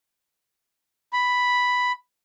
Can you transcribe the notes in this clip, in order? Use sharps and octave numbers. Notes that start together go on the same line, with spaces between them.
B5